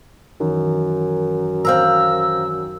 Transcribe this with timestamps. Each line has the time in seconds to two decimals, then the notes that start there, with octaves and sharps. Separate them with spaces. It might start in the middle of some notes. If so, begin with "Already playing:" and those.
0.40 F#2 D#3 E3 D#4
1.65 C4 F5 A#5 E6